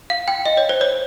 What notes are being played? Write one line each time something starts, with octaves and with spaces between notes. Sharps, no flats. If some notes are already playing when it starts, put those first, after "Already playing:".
F5
G5
D#5
C#5
C5
C#5